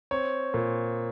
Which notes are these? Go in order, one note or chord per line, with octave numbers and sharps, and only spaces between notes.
C4 C#5
A#2